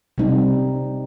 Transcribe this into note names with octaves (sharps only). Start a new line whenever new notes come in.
C3 G3 C4 D#4